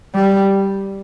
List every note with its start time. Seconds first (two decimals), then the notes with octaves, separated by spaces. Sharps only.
0.15 G3